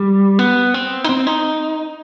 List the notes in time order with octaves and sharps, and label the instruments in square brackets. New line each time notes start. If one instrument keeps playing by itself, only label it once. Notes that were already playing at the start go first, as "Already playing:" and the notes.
Already playing: [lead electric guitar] G3
B3
C4
D#4
C4
D#4